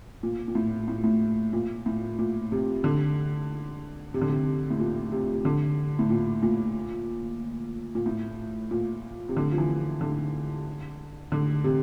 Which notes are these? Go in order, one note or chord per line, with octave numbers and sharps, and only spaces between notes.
A#2
A#2
A2
A2
A2
A#2
A2
A#2
C3
D3
C3
D3
C3
A2
A#2
C3
C3
D3
A2
A#2
A#2
A#2
A2
A#2
C3
D3
F3
E3
D3
D3
C3